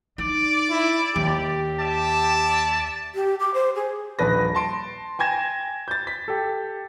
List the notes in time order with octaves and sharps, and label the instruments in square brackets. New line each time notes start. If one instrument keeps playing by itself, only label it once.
[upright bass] D#4 [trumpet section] D5
[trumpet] E4
[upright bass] D#2 [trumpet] G4
[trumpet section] D5 E5 A5
[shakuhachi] G4
D6
C5
G#4
[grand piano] D#1 A#1 B4 A#6
A5 C6 D7
G5 G#5 G#6 A#6 E7
G6 A6
B6
G4 A4